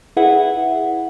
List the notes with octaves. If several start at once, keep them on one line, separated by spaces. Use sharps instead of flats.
E4 G#4 B4 E5 F#5